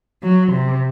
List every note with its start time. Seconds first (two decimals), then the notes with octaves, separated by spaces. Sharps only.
0.23 F#3
0.53 C3